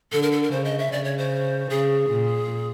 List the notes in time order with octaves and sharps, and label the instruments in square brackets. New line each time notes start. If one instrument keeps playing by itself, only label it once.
[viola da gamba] D3 [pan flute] A4
[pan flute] A#4
A4
A#4
[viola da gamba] C#3 [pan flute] C5
[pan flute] D#5
E5
[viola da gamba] C#3 [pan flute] D5
[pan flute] C#5
C5
[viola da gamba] C#3 [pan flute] G#4
[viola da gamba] A#2